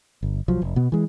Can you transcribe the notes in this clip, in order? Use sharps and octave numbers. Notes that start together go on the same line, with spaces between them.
G1
B1 F3 F#3
F1
B2 B3
E3 G#3